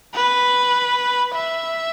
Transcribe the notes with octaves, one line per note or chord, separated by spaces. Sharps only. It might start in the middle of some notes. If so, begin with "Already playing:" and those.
B4
E5